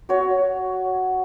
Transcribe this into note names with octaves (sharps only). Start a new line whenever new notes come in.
F#4 C#5